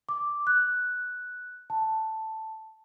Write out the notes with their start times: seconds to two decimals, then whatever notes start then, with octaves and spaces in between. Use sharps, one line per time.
0.09 D6
0.47 F#6
1.70 A5